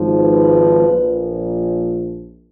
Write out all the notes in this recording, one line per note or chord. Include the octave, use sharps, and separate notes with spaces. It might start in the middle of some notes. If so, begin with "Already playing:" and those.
Already playing: G#1 G#2 F3
B4
A#1 A#2 F3